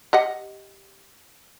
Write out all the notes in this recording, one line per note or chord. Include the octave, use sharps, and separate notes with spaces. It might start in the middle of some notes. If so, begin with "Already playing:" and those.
G4 D#5 F#5